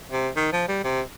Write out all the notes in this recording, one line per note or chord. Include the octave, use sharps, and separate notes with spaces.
C3
D#3
F3
G3
C3